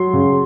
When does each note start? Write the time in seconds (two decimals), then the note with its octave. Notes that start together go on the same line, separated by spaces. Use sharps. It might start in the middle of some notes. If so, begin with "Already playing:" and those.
Already playing: F#3 C6
0.13 C#3